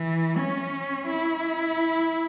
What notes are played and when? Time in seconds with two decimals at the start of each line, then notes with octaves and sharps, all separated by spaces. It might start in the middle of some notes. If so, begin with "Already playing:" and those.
Already playing: E3
0.37 C#4
1.06 E4